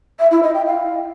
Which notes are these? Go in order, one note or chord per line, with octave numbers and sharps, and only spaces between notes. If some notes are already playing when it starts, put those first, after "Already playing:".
E5
E4
D#5
G5
F5